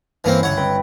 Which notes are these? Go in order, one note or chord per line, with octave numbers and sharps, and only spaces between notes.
G2 E3 A#3 C4 C#4 E4
G1 C#2 C#5 F#5
C4 B4 G5